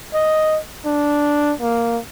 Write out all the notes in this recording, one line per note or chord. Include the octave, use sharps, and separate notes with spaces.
D#5
D4
A#3